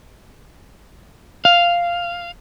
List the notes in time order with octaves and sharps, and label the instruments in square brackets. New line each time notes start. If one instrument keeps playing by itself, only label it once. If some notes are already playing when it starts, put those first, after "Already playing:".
[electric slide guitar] F5